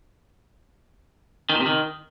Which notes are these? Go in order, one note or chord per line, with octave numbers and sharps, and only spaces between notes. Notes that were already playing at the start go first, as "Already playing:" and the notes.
D#3
A#2
C3
D#3